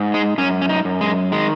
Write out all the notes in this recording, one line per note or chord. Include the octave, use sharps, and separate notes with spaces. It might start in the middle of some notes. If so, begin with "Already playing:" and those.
Already playing: G#2
G#3
F#2 C#4
C#4
D#4
F#2
G#3
D#3 G#3